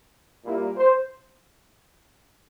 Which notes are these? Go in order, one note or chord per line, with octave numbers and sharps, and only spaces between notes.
A#2 G3 A#3 E4
C5